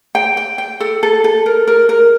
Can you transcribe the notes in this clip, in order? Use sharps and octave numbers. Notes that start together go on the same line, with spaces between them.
G5
G5
G5
A4
A4
A4
A#4
A#4
A#4